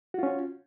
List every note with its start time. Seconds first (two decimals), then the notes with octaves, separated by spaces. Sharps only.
0.14 F#4
0.19 F4
0.23 C#4